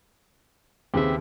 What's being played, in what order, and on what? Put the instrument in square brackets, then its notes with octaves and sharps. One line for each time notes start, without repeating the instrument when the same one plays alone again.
[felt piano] D#2 C#3 [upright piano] C4 G#4 [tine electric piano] G4 B4 E5